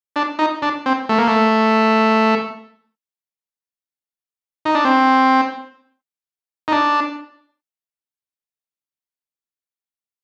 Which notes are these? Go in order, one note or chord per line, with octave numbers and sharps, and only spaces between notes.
D4
D#4
D4
C4
A3
A#3
A3
D#4
D4
C4
D#4
D4